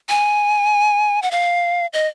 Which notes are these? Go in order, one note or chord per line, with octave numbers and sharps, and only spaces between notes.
G#5
F#5
F5
D#5